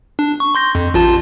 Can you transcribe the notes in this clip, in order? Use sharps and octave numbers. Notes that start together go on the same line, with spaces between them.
D4
C#6
C6 G6 A#6
F2
A1 F4 A5